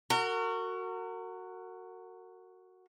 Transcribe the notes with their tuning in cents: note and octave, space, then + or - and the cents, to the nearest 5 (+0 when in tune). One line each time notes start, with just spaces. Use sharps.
F#4 +0 A#4 -35